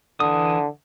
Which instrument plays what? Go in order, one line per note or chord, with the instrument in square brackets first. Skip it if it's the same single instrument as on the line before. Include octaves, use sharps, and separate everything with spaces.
[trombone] D3 [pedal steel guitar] E3 D#6